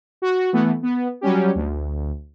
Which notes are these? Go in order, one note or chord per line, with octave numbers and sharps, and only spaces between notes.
F#4
E3 A3 B3
B3
F#3 G3 C#4 G4
D2